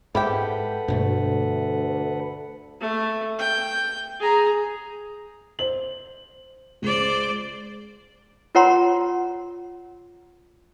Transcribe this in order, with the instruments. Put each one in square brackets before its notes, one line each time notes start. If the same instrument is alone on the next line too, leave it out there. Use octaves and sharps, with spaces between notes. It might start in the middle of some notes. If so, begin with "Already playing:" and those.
[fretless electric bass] G#2 [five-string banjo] E4 G4 G5 [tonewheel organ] A4 B4 F#5
[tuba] D2 [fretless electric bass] G2 B2 A3
[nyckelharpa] A3
G5
G#4 A#5
[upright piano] C5 F#7
[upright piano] C#2 [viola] C5 D5
[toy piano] F4 A#4 C#5 F#5 A#5 C6